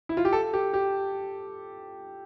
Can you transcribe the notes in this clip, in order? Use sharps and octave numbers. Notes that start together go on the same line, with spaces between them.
E4
F4
G4
A4
G4
G4